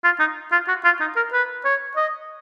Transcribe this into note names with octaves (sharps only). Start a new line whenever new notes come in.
F4
D#4
F4
F#4
F4
D#4
A#4
B4
C#5
D#5